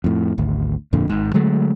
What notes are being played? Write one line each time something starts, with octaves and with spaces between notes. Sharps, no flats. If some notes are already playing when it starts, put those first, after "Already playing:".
F2 A2
G#1 D2
D1 F2 A#2 D3
G#1 G#2
D3 F#3 G#3 A3